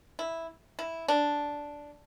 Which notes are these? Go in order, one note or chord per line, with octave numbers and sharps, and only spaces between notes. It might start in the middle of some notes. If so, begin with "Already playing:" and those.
E4
E4
D4